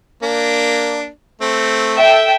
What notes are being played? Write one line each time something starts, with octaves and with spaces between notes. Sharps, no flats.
A#3 D4
A3 C4
A4 E5 G5